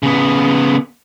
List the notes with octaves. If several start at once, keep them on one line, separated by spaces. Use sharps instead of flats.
C#3 B3